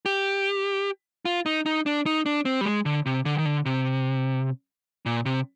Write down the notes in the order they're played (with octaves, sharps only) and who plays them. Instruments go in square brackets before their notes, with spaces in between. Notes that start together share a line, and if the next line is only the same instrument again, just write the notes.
[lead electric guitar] G4
F4
D#4
D#4
D4
D#4
D4
C4
G3
G#3
D3
C3
D3
D#3
D3
C3
A#2
C3